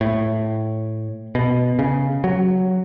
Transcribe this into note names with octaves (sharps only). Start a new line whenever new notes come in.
A2
B2
C#3
F#3